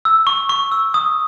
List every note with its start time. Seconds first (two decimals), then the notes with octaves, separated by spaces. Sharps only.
0.05 E6
0.27 C#6
0.49 C#6
0.72 E6
0.94 D#6